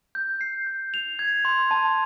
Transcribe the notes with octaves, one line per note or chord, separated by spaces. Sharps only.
G6
C7
G6
F7
G#6
C6
A5